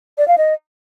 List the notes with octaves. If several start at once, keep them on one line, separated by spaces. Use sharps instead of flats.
D5
F5
D#5